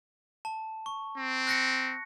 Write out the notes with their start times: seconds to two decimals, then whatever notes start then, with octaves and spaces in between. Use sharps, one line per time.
0.45 A5
0.86 C#6
1.17 C4
1.47 F#6 A#6 C#7